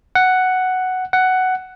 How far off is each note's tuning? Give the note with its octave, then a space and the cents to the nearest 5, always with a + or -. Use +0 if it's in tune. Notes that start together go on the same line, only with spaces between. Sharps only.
F#5 +5
F#5 +10